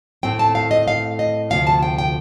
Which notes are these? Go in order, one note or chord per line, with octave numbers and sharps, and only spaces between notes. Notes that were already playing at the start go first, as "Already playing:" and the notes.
A2 A3 C4 G5
A5
F5
D#5
F5
D#5
D2 C3 F3 F5
A5
G5
G5